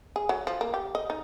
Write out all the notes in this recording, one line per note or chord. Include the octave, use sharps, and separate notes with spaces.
G#4
F#3
F3
A#3
G4
D#5
D#4